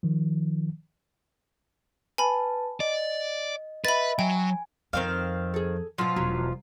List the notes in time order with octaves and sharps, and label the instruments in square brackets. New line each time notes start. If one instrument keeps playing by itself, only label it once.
[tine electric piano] D#3 F3
[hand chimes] B4 A5 [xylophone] G#5 B5
[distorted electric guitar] D5 [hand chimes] D#5
[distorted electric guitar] B4 [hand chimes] D#5 E5 [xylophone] B5 A6
[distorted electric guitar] F#3 [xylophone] G5 [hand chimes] G#5
[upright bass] F2 [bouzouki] D#3 C4 F5
[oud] G#4 A4
[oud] B2 F#3 [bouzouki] F3 F4
[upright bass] E1 [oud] F#3